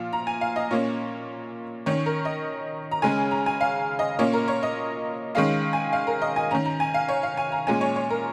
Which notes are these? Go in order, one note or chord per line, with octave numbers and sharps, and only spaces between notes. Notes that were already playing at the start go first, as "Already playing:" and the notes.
Already playing: A#2 F3 F5
A#5
G#5
F5
D#5
A#2 A#3 C#4 C#5
D#3 C#4 C#5
A#4
D#5
A#5
C#3 G#3 C#4 G#5
A#5
G#5
F5
D#5
A#2 A#3 C#4 C#5
A#4
C#5
D#5
D#3 G#3 C#4 F5
G#5
F5
A#4
D#5
G#5
D#3 C#4 A#5
A#5
G#5
F5
C#5
F5
G#5
A#5
A#2 G#3 C#4 G#5
C#5
C#5
A#4